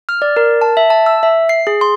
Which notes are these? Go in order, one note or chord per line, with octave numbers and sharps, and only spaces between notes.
F6
D5
A#4
A5
E5
A5
E6
E5
C7
G#4
C6